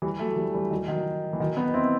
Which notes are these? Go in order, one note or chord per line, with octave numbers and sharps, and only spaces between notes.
E3 G3
F#3 A3
E3 G3
E3 G3
D#3 F#3
D#3 F#3
E3
D#3 F#3
B3 D#4
C4 E4